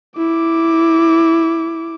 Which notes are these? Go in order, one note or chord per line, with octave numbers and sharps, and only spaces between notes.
E4 D6